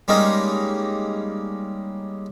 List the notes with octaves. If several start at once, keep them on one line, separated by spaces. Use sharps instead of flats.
G3 G#3 A#3 C#4 D#4